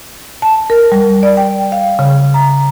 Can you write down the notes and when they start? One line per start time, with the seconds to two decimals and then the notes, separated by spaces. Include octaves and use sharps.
0.42 A5
0.70 A#4
0.92 G3
1.23 D5
1.37 G5
1.72 F5
1.99 C#3
2.34 A#5